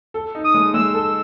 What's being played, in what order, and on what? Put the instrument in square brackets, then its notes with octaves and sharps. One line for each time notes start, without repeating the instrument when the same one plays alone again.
[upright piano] A4
D#4
[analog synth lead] D#6
[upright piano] G#3
[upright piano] G#3 [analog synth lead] E6
[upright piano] A4